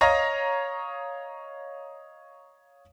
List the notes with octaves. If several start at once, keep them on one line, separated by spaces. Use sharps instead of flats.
C#5 D#5 F5 A#5 A#6